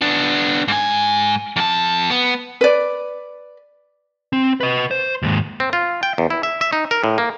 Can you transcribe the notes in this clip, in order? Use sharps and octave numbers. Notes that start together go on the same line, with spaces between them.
B3 D4
G#2 G#5
F2 A5
B3
B4 D5
C4
B4 D#5
C5
D#2 G#2
C4
F4
G5
E2
E4
E5
E5
D#4
A#4
A2
A#3